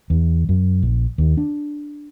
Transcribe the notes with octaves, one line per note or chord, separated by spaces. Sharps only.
E2
F#2
A#1
D#2
D4